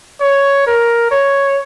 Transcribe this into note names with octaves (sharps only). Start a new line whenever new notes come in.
C#5
A#4
C#5